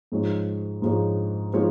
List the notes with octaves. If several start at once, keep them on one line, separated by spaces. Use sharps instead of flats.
G#2 F3 G#3 D#4 C#5
G#2 F3 G#3 D#4 C#5
F3 G#3 D#4 C#5